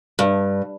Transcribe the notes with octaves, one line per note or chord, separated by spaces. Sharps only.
G2